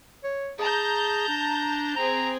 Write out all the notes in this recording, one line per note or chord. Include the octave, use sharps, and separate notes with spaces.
C#5
G#4 A5 A#5 G6
D4
C4 G#4 A#5